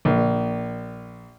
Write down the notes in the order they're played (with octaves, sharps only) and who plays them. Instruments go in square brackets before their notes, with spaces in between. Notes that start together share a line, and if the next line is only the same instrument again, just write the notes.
[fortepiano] A#1